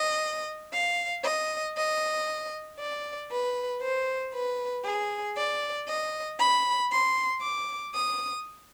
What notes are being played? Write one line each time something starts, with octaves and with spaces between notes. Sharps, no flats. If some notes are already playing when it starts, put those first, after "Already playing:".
Already playing: D#5
F5
D#5
D#5
D5
B4
C5
B4
G#4
D5
D#5
B5
C6
D6
D#6